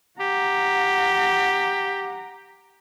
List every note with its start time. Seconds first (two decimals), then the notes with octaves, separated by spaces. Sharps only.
0.20 G4 F#5 A#5